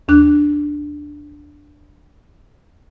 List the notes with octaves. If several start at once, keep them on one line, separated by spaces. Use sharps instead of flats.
D#2 D4 F#6